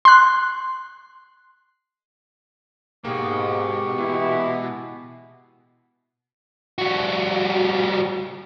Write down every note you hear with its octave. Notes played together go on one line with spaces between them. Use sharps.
C6 F#6
G#2 B2 A#3 G4 G#4 C#6 D6
E3 G#3 B3 E4
G3 F#4